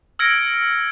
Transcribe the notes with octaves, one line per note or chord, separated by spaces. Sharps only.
E6 F6 G#6 A#6 C#7 D7